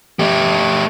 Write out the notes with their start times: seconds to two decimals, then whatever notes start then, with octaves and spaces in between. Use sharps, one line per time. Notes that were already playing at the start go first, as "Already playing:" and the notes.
0.19 A3 G4